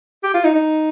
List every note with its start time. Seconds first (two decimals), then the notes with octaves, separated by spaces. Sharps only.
0.24 G4
0.34 F4
0.44 D#4
0.55 D#4